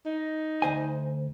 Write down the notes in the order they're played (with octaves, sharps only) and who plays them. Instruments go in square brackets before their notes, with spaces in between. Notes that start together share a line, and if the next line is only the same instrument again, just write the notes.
[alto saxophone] D#4
[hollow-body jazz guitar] D2 C5 G#5